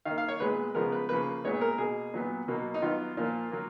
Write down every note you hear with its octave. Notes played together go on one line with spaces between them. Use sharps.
D#3 A#3 F5
F5
C#5
A#2 G#3 B3 B4
C#3 F3 G#3 B3 A#4
B4
C#3 F3 A#3 B4
A#2 G#3 B3 C#5
A#4
B2 A#3 G#4
A#2 F#3 B3
B2 F#3 A#3
D#4
D#3 F#3 B3 F4
A#2 F3 A#3 F4
F#3 A#3